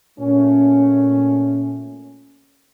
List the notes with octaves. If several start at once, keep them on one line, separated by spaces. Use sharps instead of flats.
A#2 A3 C#4